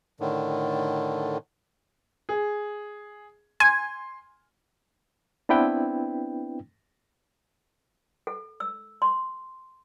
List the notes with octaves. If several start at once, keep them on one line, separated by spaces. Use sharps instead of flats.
A2 D3 D#3
G#4
G#5 C6
B3 C4 D4 E4 B4 G5
A4
E6
C6